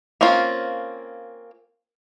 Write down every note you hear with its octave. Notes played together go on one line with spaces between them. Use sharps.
A#3 C4 C#4 F4